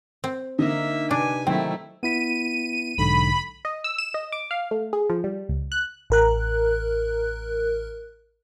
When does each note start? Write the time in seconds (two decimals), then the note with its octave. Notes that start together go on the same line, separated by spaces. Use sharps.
0.24 C4
0.59 D3 A#3 D#4 E5
1.11 C3 D4 B4 G#5
1.47 D#3 F#3 A3 A#3 C4 E4 G5
2.03 B3 E4 B6 D#7
2.98 B1 G#2 D3 B5
3.65 D#5
3.84 E6
3.98 E7
4.14 D#5
4.32 D6
4.51 F5
4.71 A3
4.93 G#4
5.10 F3
5.24 G3
5.49 C#2
5.72 F#6
6.10 A1 A#4 F#6